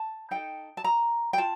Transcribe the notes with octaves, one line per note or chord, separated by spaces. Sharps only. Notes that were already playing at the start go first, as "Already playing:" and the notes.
Already playing: A5
D#4 A4 G5
A5
A#5
G5
F4 A5